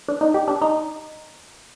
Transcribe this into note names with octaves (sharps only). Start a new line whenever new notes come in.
D4
D#4
G4
D4
D#4